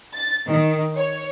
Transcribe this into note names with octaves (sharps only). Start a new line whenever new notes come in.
A6
D#3
C#5